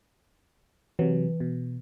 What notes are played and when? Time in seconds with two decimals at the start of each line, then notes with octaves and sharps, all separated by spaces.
0.99 C3 E3 F#3
1.40 B2